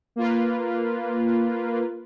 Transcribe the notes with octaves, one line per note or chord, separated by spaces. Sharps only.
A#3 F4 B4